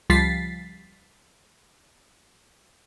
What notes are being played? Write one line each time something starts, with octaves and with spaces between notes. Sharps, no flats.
C#2 F3 G3 A6 B6 C7